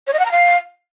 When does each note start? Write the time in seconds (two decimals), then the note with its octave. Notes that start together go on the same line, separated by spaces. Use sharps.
0.07 C#5
0.13 D#5
0.19 F#5
0.25 A#5
0.31 F5